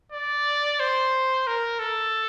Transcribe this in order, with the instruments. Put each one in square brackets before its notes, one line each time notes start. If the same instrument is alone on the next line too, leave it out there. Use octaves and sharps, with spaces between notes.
[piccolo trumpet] D5
C5
A#4
A4